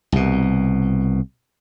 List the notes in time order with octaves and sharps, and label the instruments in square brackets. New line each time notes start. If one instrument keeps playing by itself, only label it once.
[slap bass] C2 B2